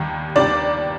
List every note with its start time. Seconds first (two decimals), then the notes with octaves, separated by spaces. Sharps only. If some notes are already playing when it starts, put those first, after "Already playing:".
Already playing: D#2 D#3 G3
0.36 D#2 D#3 G3 D4 D5